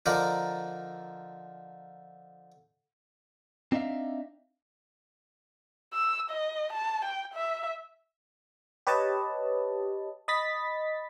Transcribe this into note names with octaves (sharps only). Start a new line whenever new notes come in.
D3 F3 D#4 A#4 D5
C4 D4 D#4 E5 F5
E6
D#5
A5
G5
E5
G4 B4 C#5 D#5 A5
D#5 B5 A6 B6